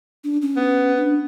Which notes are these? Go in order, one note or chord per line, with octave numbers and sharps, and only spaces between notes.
D4
C#4
B3
D4